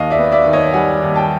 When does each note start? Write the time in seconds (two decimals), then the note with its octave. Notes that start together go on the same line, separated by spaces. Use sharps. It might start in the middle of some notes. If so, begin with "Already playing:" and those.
Already playing: D#2 D#5 F5
0.10 D5 E5
0.18 B3
0.32 D5 E5
0.46 D#3
0.53 C#5 D#5
0.74 G3 F#5 G#5
1.02 D#2
1.15 G5 A5